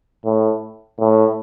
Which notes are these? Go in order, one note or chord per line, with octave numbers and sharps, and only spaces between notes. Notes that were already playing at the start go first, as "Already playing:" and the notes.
A2
A2